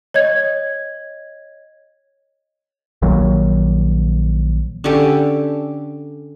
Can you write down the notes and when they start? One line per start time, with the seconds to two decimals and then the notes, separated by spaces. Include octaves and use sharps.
0.14 C#5 D#5 G#6
3.02 A#1 D#3 F#3 A#3
4.84 D3 C#4 G4 A4